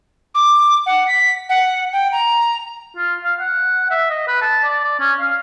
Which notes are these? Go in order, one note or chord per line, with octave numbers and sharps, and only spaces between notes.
D6
F#5
B6
F#5
G5
A#5
F4
F5
F#5
E5
D#5
B4
A5
D5
D5
C#4
F5